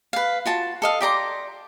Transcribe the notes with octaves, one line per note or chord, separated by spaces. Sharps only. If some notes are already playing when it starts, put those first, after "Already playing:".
B4 F5
F4 F#4 A5
A4 D#5 F5
G4 D5 A#5 C6